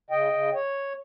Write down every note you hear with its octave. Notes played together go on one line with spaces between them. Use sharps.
C#3 D#5 G5
C#3
C#5